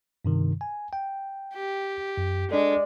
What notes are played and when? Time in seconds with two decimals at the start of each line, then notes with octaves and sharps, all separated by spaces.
0.25 G2 C3 D#3
0.61 G#5
0.93 G5
1.54 G4
2.17 F#2
2.51 G#3 D4 A4 D5